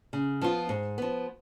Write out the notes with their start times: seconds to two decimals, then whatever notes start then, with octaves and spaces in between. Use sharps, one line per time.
0.13 C#3
0.41 F3 B3 F4
0.69 G#2
0.98 F3 B3